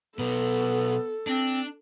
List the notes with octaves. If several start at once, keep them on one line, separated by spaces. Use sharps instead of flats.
B2 F#3 B3 A4
C4 D4